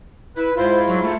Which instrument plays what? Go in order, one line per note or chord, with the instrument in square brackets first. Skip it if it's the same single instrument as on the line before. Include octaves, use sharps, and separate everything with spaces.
[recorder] E4 [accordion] B4
[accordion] G#2 E4 F4 [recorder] C5
[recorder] F#3
A3